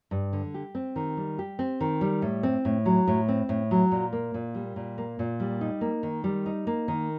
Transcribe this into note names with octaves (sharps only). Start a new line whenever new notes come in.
G2
D3
G4
C4
D#3
G3
G4
C4
D#3
G3
A2
C4
A2
F#3
A2
C4
A2
F#3
A#2
A#3
A#2
G3
A#2
A#3
A#2
G3
D#4
A#3
D#3
G3
D#4
A#3
D#3